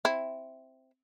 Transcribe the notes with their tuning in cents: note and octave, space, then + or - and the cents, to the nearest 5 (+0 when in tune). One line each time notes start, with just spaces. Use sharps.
C4 +0 E4 +0